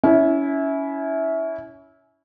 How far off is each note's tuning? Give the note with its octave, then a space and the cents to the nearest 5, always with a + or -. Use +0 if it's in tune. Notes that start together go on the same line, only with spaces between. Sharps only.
C#4 +20 E4 -15